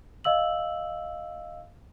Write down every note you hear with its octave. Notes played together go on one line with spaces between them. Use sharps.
D#5 F5 E6 F#7